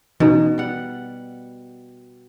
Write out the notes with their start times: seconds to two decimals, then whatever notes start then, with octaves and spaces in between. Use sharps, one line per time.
0.20 B2 E3 C#4 D#4
0.58 G3 F#5